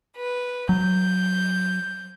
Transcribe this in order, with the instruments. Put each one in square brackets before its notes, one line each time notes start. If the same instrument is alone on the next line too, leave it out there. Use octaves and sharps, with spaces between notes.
[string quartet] B4
[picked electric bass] F#3 [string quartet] G6